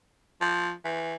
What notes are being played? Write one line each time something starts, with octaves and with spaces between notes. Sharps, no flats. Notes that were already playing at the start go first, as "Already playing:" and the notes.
F3
E3